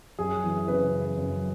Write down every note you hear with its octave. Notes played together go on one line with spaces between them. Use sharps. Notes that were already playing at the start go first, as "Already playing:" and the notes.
F#2 G#4
E3
C#3 B4
F#2
F#2